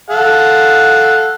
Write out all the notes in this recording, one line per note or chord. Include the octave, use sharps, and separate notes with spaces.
A4 F5 F#5